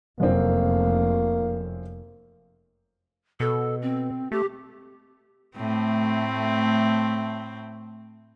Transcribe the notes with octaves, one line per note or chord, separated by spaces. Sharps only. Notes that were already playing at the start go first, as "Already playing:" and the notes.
F1 F#2 A#3 C4
B2 A4
C4
A3 G4
A2 A3 C4